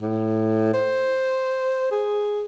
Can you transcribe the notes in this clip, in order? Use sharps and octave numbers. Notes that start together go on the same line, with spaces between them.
A2
C5
G#4